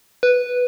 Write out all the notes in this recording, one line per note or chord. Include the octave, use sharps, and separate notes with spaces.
B4